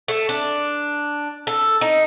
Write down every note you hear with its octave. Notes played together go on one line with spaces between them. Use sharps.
A3
D4
A4
D#4